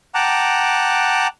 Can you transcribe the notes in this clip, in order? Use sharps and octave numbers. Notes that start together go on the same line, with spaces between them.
F#5 G5 A5 A#5 D6 F#6